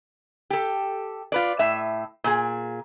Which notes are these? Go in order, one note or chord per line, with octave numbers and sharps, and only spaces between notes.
G4 A4
F4 B4 D5
A2 E5
A#2 G#4